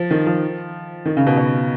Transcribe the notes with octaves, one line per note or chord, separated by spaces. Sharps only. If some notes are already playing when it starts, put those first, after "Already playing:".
Already playing: F3
D#3
F3
D#3
C#3
B2
B2